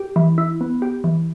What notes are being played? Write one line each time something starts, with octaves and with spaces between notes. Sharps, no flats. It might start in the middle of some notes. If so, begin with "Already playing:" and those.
Already playing: G4
E3
E4
B3
G4
E3